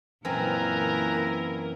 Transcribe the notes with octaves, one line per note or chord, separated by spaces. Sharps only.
F#2 A#2 E3 C4 A#4 B4 G#5 A#5